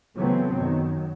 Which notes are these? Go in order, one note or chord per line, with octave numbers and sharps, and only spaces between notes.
C#3 E3 F#3 A3 B3 C4
F#2 D#3 F#3